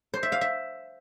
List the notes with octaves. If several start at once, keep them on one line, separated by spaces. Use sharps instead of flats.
C5
E5
F5
E5